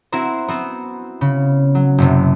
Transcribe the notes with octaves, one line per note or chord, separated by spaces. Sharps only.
C4 E4 F#4 A#4 C5
B3 C4
C#3
F#3
F#1 C3